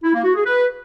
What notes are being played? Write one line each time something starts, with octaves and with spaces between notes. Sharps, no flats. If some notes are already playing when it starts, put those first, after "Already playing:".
E4
A#3
F#4
G#4
B4